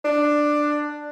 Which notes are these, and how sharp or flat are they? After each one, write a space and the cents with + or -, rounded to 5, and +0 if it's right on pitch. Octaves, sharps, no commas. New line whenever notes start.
D4 +10